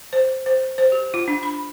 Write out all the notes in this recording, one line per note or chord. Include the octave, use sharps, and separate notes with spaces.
C5
C5
C5
G4
F4
D4
B5